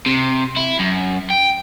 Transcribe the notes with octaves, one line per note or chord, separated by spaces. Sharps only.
C3
E4
F#2
G5